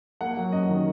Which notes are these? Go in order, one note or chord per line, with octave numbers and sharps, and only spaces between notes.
A#3 F#5
F#3
F#2 D#5
D#3